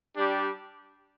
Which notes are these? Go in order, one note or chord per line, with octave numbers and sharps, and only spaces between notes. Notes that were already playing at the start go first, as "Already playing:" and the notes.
G3 D4 G4